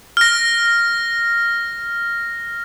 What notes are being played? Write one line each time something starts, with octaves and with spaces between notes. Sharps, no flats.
F6 A#6